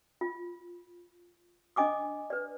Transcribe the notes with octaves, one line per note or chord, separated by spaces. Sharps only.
F4
D4 D#5 G#5 D6 D#6
B4 D5